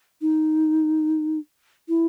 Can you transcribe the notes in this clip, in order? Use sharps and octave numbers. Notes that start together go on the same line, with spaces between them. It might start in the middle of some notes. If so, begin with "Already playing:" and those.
D#4
E4